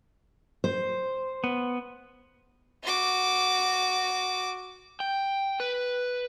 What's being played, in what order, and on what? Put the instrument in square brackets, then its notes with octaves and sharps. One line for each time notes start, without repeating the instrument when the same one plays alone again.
[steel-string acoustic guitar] C5
[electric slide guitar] B3
[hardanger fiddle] F#4 D6
[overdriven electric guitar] G5
B4